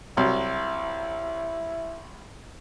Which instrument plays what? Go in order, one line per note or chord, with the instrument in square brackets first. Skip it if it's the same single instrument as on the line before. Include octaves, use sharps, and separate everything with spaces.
[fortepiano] C2 F#3 [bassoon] E4